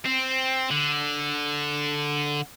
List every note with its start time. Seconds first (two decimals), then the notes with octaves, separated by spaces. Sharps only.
0.06 C4
0.71 D3